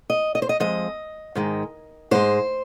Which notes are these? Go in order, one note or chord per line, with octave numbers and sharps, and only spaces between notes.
D#5
D#5
C5
D#5
F2 F3 G#3 D#5
G#2 D#3 G#3
G#2 G#3 C5